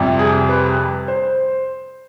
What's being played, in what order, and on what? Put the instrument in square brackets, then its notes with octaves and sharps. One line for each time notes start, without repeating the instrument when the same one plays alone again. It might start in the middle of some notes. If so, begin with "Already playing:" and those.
Already playing: [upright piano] F2 C3 G3
G#4
B4
C5